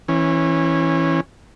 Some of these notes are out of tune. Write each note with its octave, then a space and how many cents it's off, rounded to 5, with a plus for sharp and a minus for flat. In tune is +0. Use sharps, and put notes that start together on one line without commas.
E3 +0 C#4 -25